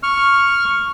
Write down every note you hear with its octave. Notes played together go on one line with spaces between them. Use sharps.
C#6 F6